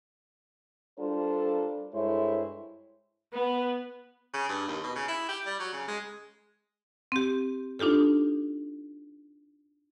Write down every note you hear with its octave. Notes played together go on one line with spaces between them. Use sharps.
G3 D4 F4 A4 A#4 C5
G2 G#3 E4 A4 C5 C#5
B3
C#3
G2
D#2
B2
C#3
E4
G4
G3
F#3
C#3
G#3
C4 G4
D4 D#4 F4 G4 A4